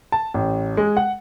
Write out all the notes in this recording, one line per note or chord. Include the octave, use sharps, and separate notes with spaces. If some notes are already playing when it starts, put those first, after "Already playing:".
A5
A1
G#3
F#5